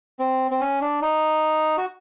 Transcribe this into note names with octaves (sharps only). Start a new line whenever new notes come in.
C4
C4
C#4
D4
D#4
F#4